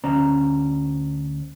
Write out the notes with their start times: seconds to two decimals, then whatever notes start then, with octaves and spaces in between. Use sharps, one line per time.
0.04 D2 C#4 C5 D5 A#5